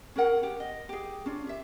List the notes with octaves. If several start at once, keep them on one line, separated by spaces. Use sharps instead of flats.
C#4 G#4 A#4 F#5
G4
D#5
G4 G#4
C#4 D4 F4
G4 E5